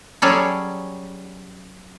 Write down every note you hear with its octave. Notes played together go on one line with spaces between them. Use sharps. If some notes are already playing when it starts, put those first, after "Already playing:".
F#3 G3 C#4 G#4 A4